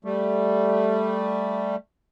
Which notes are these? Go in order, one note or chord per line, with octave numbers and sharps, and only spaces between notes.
G3 A3